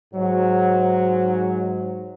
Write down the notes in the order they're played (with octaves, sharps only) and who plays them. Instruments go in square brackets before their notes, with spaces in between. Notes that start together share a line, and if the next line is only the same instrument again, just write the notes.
[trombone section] G#2 F#3